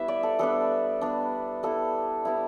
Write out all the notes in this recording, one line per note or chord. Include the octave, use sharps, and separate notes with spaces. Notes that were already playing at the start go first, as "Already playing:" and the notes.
Already playing: G3 B3 E4 B4 E5
D5
A4
G3 B3 D4 A4
G3 B3 D4
G3 B3 E4 A4
G3 B3 E4